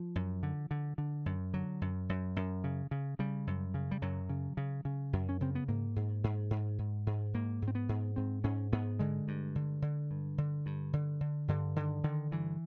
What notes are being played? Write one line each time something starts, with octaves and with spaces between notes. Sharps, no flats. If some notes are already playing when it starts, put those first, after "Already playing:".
Already playing: F3
F#2
D3
D3
D3
F#2
D3 F#3
F#2
F#2
F#2
C#3
C#3
C#3 G3
F#2
C#3
G3
F#2 F#3
C#3
C#3
C#3
F#2
C#4
C#3 C4
B3
G#2 A#3
G#2
G#2
G#2
G#2
G#2
G#2 A#3
G#2
C4
B3
G#2
G#2 C4
G#2 C#4
G#2 B3
D3 G#3
G2
D3
D3
G2
D3
G2
D3
D3
G2 D3
D3 D#3
D3 D#3
G2 E3